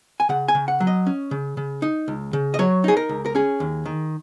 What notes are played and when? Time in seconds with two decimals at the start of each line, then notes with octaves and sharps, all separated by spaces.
0.20 G#5
0.29 C#3 F#5
0.48 G#5
0.55 C#3
0.68 F#5
0.80 F#3
0.87 D#5
1.06 C#4
1.31 C#3
1.57 C#3
1.82 D#4
2.08 C#2
2.33 C#3
2.54 D#5
2.59 F#3 C#5
2.84 D#4 G#4
2.97 A#4
3.09 C#2
3.26 A#4
3.35 C#4 G#4
3.60 D#2
3.86 D#3